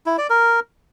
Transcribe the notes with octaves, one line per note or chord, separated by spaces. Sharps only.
E4
D5
A#4